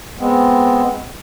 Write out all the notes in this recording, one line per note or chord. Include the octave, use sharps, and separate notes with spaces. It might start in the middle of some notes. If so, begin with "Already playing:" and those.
G#3 B3 C4